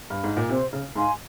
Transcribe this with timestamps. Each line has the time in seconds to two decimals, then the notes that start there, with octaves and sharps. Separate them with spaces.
0.10 G2
0.24 G#2
0.37 A#2
0.49 C3 C5
0.73 C#3
0.95 G#2 F5 G#5 C6